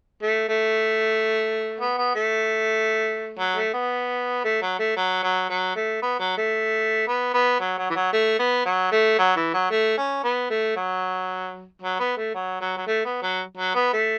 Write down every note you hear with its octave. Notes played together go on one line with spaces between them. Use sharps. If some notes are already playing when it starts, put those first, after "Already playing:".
A3
A3
B3
B3
A3
F#3
A3
B3
A3
F#3
A3
F#3
F#3
F#3
A3
B3
F#3
A3
B3
B3
F#3
F#3
E3
F#3
A3
B3
F#3
A3
F#3
E3
F#3
A3
C#4
B3
A3
F#3
F#3
B3
A3
F#3
F#3
F#3
A3
B3
F#3
F#3
B3
A3